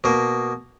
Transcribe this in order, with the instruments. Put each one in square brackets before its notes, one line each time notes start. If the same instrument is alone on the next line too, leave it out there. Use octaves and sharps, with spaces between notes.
[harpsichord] B2 A#3